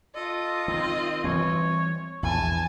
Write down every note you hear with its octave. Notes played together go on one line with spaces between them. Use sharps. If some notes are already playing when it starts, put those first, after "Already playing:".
F4 A4 D#5
D#3 C4
E3 G3 C4 C#5
A#1 E2 E3 G#5 A5